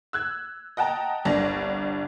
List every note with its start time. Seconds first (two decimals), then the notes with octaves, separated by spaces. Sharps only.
0.13 E6 F#6 G#6
0.77 D#5 F#5 G5 A5 A#5
1.25 G1 C2 D4 D5 A#6